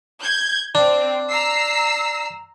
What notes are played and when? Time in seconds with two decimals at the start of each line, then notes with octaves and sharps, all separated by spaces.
0.21 G6 G#6
0.75 C4 D4
1.28 A#5 E6 C7